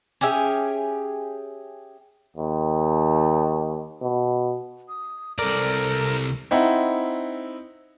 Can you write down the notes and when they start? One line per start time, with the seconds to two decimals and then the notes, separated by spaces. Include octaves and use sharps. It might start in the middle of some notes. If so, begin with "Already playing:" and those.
0.21 C#4 G4 G#4 E5
2.37 D#2
4.01 B2
4.88 D#6
5.39 C2 A4 A#4 D5
6.51 C4 D#4 E4 F#5